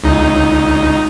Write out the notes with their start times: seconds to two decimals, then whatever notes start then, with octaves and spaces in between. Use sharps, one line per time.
0.04 C#2 D#4